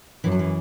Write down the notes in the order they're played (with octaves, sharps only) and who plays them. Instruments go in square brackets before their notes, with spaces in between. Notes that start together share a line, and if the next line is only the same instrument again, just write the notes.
[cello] F#2 [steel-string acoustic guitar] E3
[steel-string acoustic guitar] F#3
E3